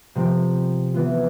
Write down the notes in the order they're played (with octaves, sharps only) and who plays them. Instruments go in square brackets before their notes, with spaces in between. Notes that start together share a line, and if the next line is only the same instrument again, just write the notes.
[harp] C3 F3 C4
E3 B3 F4